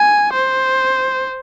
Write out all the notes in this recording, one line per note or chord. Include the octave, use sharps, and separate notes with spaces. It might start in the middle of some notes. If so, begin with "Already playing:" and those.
Already playing: G#5
C5